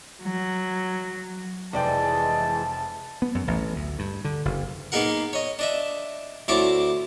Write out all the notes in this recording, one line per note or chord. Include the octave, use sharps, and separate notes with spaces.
F#3
F1 E3 G#3 D5 G5 A5
B3
F#2
A1
D2
G2
D3
F#1
A#3 B3 D#4 G#4 A#4 F#5
C#5 D#5
D4 D#5 E5
D2 C4 E4 C#5 A5 D6